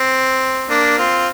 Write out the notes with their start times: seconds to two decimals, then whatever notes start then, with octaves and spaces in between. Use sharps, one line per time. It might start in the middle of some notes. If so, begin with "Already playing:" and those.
Already playing: C4
0.70 A#3 D4
0.98 C4 F4